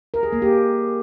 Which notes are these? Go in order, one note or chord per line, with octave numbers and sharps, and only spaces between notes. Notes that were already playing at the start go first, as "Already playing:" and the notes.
A#4
G#4
A#3
G4